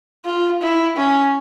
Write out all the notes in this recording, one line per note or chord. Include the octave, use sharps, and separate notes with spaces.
F4
E4
C#4